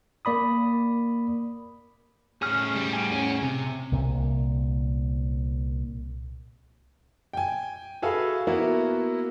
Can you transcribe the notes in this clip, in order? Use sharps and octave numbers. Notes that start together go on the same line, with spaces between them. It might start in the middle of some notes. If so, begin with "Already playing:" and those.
A#3 D5 B5 D#6
A2 C#4 G#4 F6
G3
G#5
C#4
C3
C2 A#2
G5 G#5
F#4 G#4 A4 B4 E5 F5
A#3 B3 E4 F#4